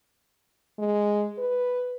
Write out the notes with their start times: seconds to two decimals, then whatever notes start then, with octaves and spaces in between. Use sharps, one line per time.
0.79 G#3
1.38 B4